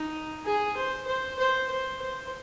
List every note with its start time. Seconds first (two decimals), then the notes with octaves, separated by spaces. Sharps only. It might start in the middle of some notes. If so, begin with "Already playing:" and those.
Already playing: D#4
0.44 G#4
0.76 C5
1.07 C5
1.38 C5
1.70 C5
2.01 C5